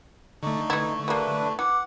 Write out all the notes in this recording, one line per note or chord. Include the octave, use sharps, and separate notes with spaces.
D3 A3 D#4 C#6
E3 E4
G3 A#3 D4 E4 B4
E3 F#5 D6